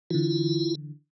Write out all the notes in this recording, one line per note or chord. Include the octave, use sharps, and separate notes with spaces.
D3 E3 E4 F4